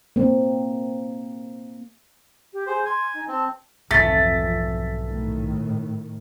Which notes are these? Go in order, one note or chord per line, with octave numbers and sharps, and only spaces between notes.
A#3 C4
G4
G#4 C5
G#5 C6
D#4
C4 A5
B1 F2 G#2 E3 A3 A6 B6
A2 D#3